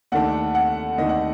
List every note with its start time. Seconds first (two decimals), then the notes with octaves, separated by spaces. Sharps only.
0.12 D#2 D#3 A3 D4 F#5
0.55 F#5
0.98 D#2 D#3 A3 D4 D#5
1.09 F#5